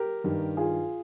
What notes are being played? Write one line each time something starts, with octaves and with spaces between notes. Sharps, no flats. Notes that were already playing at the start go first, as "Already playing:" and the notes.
Already playing: G4 A#4
G2 D#3
F4 G#4